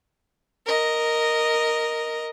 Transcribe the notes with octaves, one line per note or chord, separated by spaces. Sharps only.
A#4 D#5